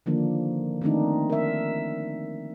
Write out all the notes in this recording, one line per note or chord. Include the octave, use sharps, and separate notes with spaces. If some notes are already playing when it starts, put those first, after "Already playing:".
D3 D#3 F3 A#3 D4
D#3 A3 C4 D4 D#4
A#4 E5